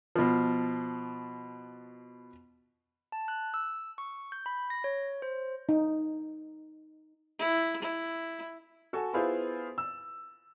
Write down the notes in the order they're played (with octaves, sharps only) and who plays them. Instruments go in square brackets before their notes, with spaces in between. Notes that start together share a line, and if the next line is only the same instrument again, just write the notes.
[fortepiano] B2 F3
[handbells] A5
F#6
E6
C#6
G6
B5
A#6
C#5
C5
[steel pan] D#4
[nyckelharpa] E4
E4
[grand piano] F#4 A4 G#5
B3 E4 F4 G#4 B4 C5
E6